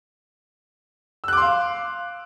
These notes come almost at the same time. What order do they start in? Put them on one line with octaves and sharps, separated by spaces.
E6 F#6 D6 C6 F5